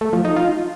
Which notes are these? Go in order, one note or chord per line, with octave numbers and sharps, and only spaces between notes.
A3
F3
D#4
F4